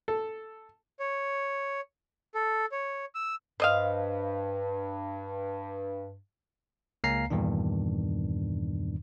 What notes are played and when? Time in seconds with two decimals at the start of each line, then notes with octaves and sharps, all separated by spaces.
0.08 A4
0.99 C#5
2.35 A4
2.72 C#5
3.15 E6
3.60 G2 C5 D#5 F5
7.04 C#2 A#3 F5 G#5 A#5 C7
7.30 E2 G2 A#2 D#3 D4